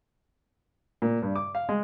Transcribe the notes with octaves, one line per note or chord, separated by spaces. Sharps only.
A#2
G2
D6
F5
G#3